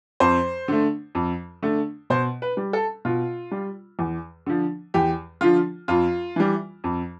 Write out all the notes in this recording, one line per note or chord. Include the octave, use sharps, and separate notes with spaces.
F2 C5
D3 A3
F2
D3 A3
B2 C5
B4
G3
A4
B2 F4
G3
E2
D3 F3
E2 G4
D3 F3 F4
F2 F4
E3 G3
F2